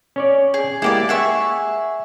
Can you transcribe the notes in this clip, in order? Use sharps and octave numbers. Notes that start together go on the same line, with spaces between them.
C#4 C#5 D5
G#4
G#3 A#3 E4 G4 D5
G#4 E5 F#5 C#6